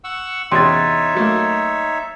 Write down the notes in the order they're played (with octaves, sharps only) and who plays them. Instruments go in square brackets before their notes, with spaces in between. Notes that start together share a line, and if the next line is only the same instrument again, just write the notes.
[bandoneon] F#5 C#6 E6
[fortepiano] E2 C3 C#4 [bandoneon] D#4 C#5 E5 [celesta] C6 A6
[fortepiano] F#3 A3 A#3